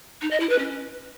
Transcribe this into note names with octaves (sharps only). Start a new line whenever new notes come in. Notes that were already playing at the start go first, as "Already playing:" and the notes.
D#4
D#5
E4
B4
C#4